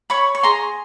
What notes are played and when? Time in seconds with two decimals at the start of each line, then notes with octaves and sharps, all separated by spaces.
0.10 C#5 B5 C#6
0.35 C#6
0.43 G#4 A#5 C6